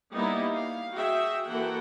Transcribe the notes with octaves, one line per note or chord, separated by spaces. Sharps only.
G3 A#3 B3 D#4 E4 G4
F5
F#4 G#4 E5 G5
E3 A#3 F#4 A4 F#5 G5